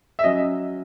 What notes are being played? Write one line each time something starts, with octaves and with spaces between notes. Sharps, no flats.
E5
F#3 C#4 D#5